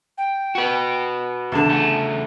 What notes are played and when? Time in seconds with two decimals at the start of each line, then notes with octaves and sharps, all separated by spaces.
0.18 G5
0.55 F#4 B4
1.52 E2 D3 A5
1.66 C#3 A3